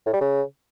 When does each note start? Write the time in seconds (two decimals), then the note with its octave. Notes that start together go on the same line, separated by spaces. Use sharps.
0.06 A2
0.13 G3
0.21 C#3